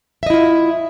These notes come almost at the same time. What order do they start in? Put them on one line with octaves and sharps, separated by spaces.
E5 D#5 E4 F4